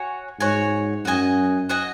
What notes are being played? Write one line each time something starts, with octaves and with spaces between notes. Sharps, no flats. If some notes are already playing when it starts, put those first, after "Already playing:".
Already playing: F#4 C#5 G#5
G#2 F#4 C#5 G#5
F#2 F#4 D#5 G#5
F#4 D#5 G#5